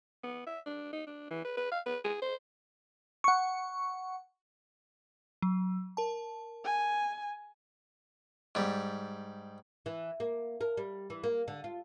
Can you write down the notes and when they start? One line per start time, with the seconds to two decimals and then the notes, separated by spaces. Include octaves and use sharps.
0.23 B3
0.46 E5
0.66 D4
0.92 D#4
1.07 D4
1.30 E3
1.44 B4
1.57 B4
1.71 F5
1.86 B4
2.04 G#4
2.22 C5
3.24 F#5 C#6
5.42 F#3
5.97 A#4 A5
6.64 G#5
8.55 G#2 G3
9.86 E3
10.20 A#3
10.61 A#4
10.77 G3
11.10 E3
11.23 A#3
11.48 D3
11.64 F4